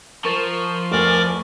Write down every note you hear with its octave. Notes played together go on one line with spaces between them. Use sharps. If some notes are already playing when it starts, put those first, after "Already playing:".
F3 A#4 C#6 A6
F1 D2 A#4 D5 G#5 D6